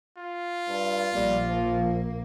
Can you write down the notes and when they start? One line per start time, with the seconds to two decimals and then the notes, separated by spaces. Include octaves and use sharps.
0.18 F4
0.69 G2
1.16 A#1 G3 A#3
1.49 F3